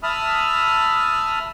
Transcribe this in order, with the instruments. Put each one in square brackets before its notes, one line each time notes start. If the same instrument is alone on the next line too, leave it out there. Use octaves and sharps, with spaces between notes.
[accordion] E5 A5 B5 D#6 F6